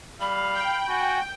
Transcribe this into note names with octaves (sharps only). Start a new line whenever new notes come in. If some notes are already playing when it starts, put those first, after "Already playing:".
G3 F5 B5
G5
F#4 G#5